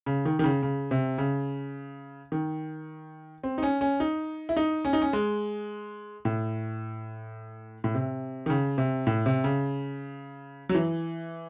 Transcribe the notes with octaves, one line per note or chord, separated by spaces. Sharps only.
C#3
D#3
D#3
C#3
C#3
C3
C#3
D#3
C4
D#4
C#4
C#4
D#4
E4
D#4
C#4
D#4
C#4
G#3
A2
A2
C3
D#3
C#3
C3
A2
C3
C#3
F#3
E3